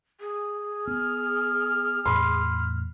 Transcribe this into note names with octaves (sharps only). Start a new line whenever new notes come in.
G#4
B3 F6
E2 A2 B5 C6